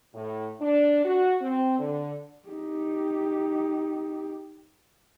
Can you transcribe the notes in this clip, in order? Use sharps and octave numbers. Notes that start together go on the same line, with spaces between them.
A2
D4
F#4
C4
D3
D#4 G4